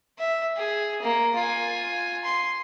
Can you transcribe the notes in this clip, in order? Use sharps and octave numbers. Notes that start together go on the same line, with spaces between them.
E5
G#4
A#3
F4 G#5
C6